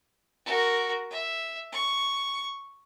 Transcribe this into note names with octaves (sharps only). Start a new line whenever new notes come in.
F#4 A#4
E5
C#6